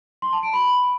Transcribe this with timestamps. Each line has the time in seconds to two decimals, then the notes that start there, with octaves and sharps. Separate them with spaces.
0.22 C6
0.33 A5
0.43 D7
0.53 B5